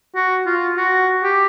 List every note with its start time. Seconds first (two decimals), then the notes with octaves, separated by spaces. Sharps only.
0.15 F#4
0.46 F4
0.77 F#4
1.23 G4